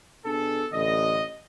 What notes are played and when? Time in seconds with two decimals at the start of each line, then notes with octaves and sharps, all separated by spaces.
0.25 B2 D4 G#4 A4
0.72 A1 D3 D#5